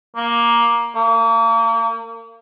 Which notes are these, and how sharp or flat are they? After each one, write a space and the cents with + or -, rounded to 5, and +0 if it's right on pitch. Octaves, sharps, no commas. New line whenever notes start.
A#3 +10
A#3 -35